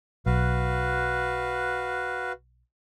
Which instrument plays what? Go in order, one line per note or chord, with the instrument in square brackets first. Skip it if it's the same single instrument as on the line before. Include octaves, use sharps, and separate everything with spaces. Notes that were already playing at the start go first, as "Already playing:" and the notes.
[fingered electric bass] B1 [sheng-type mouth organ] F#4 B4 F5